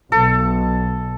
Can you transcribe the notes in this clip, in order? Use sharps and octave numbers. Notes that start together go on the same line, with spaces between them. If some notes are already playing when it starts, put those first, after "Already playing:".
B1 A4